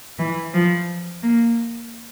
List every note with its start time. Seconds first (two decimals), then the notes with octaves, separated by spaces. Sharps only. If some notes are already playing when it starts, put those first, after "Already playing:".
0.19 E3
0.54 F3
1.23 A#3